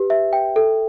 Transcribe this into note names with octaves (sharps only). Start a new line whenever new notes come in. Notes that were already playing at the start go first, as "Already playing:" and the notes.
Already playing: G4 B4
E5
G5
A4